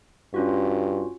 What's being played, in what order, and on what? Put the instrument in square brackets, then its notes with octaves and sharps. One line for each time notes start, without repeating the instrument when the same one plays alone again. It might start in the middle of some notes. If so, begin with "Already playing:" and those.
[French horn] G2 [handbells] C#4 F4 F#4